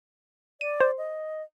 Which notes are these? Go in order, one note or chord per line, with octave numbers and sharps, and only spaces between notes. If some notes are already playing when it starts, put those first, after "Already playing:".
D5 D#7
C5
D#5